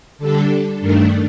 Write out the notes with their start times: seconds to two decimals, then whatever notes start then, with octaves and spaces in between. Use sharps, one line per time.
0.18 D3 G3 D4 A4
0.80 G2 D#3 A3 D4 A#4